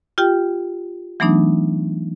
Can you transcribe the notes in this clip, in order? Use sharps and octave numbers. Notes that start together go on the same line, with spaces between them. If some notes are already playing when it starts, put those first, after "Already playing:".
F4 G4 G5
E3 F#3 A3 B3 D4 D#4